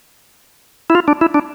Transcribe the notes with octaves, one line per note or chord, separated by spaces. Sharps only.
E4
F4
D4
E4
D4